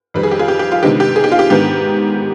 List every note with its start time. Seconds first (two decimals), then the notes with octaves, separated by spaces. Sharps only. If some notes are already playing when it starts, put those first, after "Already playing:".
0.14 F2 D#3 G3 B4
0.23 G#4
0.31 G4
0.39 F4 G#4
0.48 G4
0.59 G4
0.71 F4
0.82 C3 D#3 G#3 B3 D4 G4
1.00 G4
1.16 G#4
1.24 G4
1.32 F4
1.39 G4
1.50 G#2 D#3 B3 D4 G4